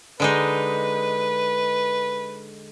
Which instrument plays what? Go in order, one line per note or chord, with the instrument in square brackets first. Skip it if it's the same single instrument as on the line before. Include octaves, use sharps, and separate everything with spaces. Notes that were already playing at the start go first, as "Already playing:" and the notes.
[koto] D3 G#3 D#4 [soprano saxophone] B4